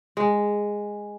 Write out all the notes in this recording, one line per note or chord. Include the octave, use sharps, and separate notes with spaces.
G#3